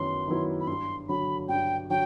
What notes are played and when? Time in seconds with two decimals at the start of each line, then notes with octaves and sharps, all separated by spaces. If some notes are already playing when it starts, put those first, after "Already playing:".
Already playing: F#2 D#3 F#3 B3 E4 C6
0.27 D#3 F#3 B3 E4
0.60 B5
0.67 G2 C6
1.08 D3 F#3 B5
1.49 G2 G5
1.90 D3 F#3 G5